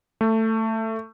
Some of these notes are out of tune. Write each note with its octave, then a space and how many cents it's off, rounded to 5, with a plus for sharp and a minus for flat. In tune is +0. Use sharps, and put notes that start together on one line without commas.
A3 +15